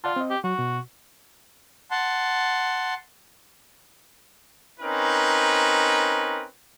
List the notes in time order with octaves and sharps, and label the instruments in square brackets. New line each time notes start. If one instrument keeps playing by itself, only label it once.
[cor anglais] F4 [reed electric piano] D5 F#5 A5
[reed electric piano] C4 D#5
[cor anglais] G4
[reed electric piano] F#3 [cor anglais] F#4
[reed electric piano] B2
[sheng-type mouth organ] F#5 A5 C6
[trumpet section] C4 C#4 D#4 A#4 B4